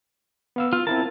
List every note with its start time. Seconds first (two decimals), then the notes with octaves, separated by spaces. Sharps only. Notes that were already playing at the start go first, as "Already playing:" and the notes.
0.56 B3 F5 E6
0.73 F4
0.87 C4 E4 A#4 A5